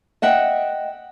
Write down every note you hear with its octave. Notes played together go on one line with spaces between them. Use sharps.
D#5 E5 F#5 G5